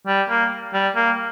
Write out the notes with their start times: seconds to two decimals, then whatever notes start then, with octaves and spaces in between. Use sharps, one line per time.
0.07 G3
0.29 A#3
0.73 G3
0.95 A#3